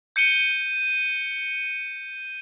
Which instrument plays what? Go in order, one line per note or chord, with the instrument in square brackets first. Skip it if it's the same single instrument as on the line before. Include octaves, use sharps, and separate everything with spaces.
[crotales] G6 C#7 D#7 G7